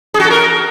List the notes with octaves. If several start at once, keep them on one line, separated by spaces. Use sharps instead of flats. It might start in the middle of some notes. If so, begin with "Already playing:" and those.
G#4
F#4
A4
A#4